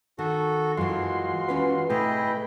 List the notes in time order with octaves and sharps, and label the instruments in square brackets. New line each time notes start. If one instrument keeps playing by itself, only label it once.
[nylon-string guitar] D#3 [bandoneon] F#4 A4
[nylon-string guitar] F#2 E3 [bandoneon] G#3 [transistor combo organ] F4 F#4 C6
[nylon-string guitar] E3 C#4 B4
[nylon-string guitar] A2 C3 [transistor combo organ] A3 B4 G5 [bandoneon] E4 G#4 D#5